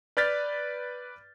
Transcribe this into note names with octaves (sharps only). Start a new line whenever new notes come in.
B4 D5 F6 G6 A6 B6